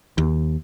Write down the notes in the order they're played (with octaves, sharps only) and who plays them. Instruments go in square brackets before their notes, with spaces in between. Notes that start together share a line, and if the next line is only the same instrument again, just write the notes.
[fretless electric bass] D#2